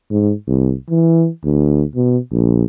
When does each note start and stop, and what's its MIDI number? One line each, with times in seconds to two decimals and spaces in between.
0.11 0.33 44
0.47 0.74 36
0.90 1.28 52
1.44 1.83 38
1.96 2.18 47
2.32 2.64 34